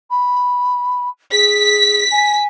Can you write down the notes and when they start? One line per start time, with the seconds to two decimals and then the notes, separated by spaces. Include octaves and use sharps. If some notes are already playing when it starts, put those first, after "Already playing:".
0.10 B5
1.32 G#4 B6
2.11 G#5